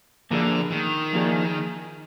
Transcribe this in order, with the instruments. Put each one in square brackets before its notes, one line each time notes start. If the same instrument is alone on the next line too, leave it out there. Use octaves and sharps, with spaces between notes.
[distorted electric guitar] D3 [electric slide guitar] F3 A#3 F4 G#4 D5
[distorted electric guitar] D#3
[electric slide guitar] F3 A#3 F4 G#4 D5